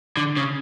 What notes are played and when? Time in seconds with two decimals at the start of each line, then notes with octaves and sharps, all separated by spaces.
0.17 D3
0.37 C#3